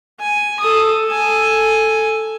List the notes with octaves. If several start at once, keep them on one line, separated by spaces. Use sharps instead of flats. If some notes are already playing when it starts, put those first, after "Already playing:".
G#5
A4 D#6
A4 G#5